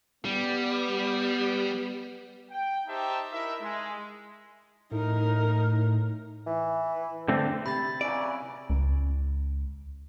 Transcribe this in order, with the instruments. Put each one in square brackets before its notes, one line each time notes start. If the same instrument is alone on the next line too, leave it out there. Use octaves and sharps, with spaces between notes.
[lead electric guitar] G3 [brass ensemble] B3
[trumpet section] G5
D#4 G4 C5 E5 A5
D#4 E4 A#4 E5
G#3
[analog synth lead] A2 [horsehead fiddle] D#4 A#4
[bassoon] E3
[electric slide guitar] D3 A3 C4
[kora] C3 [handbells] B5 A6
[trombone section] C#3 E3 F#3 [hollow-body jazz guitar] D5
[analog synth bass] C#2